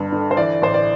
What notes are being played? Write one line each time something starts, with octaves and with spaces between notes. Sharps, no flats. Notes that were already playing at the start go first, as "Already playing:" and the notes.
Already playing: G1 G2
D3
C5
E3 D5
A1 C5
D5